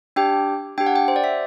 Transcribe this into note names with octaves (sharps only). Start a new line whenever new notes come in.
D4 G4 G5
D4 G4 G5
F#5
G5
C5
D5
E5